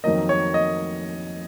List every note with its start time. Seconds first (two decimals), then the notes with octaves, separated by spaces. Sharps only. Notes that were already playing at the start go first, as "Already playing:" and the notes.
0.04 F2 D#3 F#3 A#3 D#5
0.29 C#5
0.54 D#5